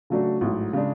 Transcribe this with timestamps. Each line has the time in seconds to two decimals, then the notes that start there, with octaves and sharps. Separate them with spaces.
0.10 C#3 F#3 A3 D4 F#4
0.41 A1 G#2 F#3
0.73 C#3 G#3 D4